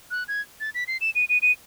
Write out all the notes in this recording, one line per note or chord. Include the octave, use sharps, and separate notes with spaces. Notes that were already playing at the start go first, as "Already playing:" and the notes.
F#6
G#6
A6
B6
C7
E7
D#7
D#7
D#7